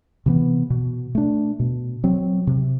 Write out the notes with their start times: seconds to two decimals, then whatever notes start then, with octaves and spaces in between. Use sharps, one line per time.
0.26 C3 E3 B3
0.70 B2
1.15 A3 D4
1.59 B2
2.04 F#3 C4
2.47 C3